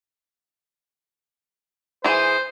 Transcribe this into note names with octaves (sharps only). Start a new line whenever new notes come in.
E3 G#4 C5